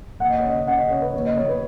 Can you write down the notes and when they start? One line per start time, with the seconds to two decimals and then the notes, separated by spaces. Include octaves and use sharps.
0.20 D#2 F#5
0.30 D#5
0.39 C#5
0.44 C#3 D#5
0.67 C#3 F#5
0.79 D#5
0.90 C#3 C#5
1.02 B4
1.13 D#2 C#5
1.25 D#5
1.36 D#2 C#5
1.48 B4